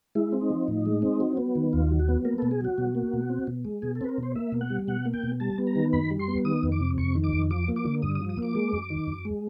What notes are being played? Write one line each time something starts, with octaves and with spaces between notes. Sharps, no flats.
G#3 E4
C4
D#4
F3
A2
G#3
C4
F#3
B3
D#3
D#2 F4
F#3
F#4
B3
A#3 A#4
B2 A4
G#4
F#3 F#4
B2
A#3
B2
C4
B2
G#3
B2 G#4
A4
C4 B4
A#4
B2 C5
A#3 E5
B2
F#5
G3
B2 F#5
A#3
G5
B2
G3 A5
B3
A#5
D#3
F#2 B5
G3
C6
B3
D#3 D#6
F2
D6
C3
F2 C#6
D#3
D6
F2
F3 D6
A#3
D6
D3
G2 D#6
D#6
F3
D#6
A#3
D6
G#3
F#2
D#3
F#2
G#3